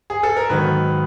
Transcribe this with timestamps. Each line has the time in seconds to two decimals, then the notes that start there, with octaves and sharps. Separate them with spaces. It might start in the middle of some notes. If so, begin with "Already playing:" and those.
0.10 G#4
0.23 A4
0.36 A#4
0.50 G#2 D#3 F#3 B3 B4